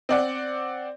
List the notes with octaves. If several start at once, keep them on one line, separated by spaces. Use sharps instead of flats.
C4 D5 F#5